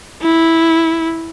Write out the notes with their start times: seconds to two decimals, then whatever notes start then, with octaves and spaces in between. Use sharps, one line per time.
0.22 E4